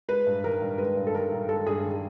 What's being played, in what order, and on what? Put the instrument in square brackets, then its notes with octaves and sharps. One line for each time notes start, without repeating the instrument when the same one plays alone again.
[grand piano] G#3 [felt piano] B4
[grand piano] G2
[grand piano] D#3 [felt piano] A#4
[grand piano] G2
[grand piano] G#3 [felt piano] B4
[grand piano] G2
[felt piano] A4
[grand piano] D#3 [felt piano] A#4
[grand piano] G2
[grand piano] G#3 [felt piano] A4
[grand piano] G2 [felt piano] G#4
[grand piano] D#3